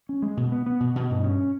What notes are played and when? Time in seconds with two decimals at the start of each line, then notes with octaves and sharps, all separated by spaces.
0.09 C#4
0.22 G#3
0.37 B2
0.52 B3
0.66 B3
0.80 B2
0.96 B2
1.10 G2
1.24 C#4